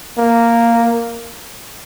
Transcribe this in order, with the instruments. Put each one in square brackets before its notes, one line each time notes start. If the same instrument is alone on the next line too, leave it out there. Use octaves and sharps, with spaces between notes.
[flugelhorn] A#3